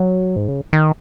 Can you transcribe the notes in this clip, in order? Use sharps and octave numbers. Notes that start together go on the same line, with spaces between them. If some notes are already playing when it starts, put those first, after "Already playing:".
Already playing: F#3
G#2
C#3
D#3